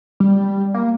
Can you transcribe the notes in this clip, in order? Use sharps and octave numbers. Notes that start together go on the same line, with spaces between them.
G3
A#3